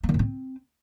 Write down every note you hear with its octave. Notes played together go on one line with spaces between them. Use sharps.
A#3
D#3
A2
C4